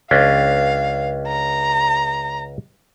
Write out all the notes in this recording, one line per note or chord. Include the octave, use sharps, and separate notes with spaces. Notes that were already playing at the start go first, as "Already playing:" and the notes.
C#2 C#4 D4 F5
A#5